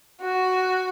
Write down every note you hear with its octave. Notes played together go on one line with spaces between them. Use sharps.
F#4